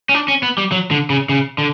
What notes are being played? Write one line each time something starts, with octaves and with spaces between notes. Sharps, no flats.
C#4
D4
C#4
B3
G3
F#3
D3
C#3
C#3
D3